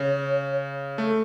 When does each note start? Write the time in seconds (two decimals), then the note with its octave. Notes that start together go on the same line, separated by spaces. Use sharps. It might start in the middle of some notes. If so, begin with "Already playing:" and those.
Already playing: C#3 C#5
0.98 A3 A4